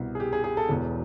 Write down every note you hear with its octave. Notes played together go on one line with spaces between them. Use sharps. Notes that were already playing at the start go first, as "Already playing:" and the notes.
Already playing: C2 B2
G#4
G4
G#4
G#4
A4
E1 E2 B2